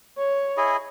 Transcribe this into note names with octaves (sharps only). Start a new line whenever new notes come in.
C#5
E4 G#4 D#5